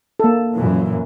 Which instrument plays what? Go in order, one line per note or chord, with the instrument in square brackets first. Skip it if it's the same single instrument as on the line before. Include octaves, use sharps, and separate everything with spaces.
[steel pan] A#3 A4
[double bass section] F#2 A#2 E3